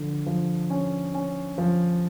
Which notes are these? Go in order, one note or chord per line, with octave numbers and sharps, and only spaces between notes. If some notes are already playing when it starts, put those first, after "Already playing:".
Already playing: D3 F3
F3
C#4
C#4
F3